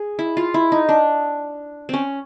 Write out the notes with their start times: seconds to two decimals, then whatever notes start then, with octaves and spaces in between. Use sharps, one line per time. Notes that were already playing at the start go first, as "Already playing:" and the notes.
Already playing: G#4
0.19 E4
0.37 F4
0.54 E4
0.72 D#4
0.89 D4
1.89 C4 C#4